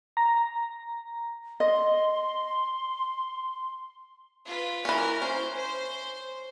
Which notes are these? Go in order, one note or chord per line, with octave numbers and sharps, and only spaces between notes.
A#5
D#5 C6
F4 B4
E3 C#4 A#4 F6
C#4 C5
C5